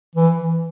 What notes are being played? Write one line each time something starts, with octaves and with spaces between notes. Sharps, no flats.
E3